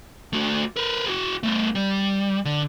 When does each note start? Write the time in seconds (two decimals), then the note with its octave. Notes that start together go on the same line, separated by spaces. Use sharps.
0.33 A3 F#4
0.76 A#4 B4
1.06 F#4 G#4
1.43 A3 B3
1.75 G3
2.45 D3